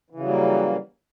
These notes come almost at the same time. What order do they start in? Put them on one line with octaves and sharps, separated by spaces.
E3 C#3 F#3 G3 A#3